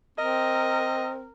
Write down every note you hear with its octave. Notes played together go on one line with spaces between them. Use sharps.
C4 A#4 D#5